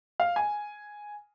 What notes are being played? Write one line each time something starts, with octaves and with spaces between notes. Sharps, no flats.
F5
G#5